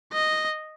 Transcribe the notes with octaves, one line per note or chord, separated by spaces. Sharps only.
D#5